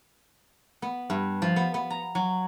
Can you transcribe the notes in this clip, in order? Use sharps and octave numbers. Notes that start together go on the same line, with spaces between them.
B3
G2
F3
B3
B3
A#5
F#3